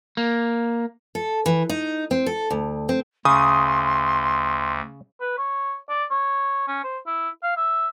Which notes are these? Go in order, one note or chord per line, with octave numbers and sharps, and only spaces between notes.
A#3
A4
E3
D#4
C4
A4
D2
C4
D2 C#3 C6 D#6
B4
C#5
D5
C#5
C#4
C5
E4
F5
E5